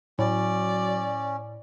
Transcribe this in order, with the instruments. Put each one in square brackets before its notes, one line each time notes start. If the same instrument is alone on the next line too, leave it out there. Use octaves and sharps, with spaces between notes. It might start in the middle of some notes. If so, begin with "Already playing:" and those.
[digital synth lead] A2 [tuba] F#3 [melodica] C#4 [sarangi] D5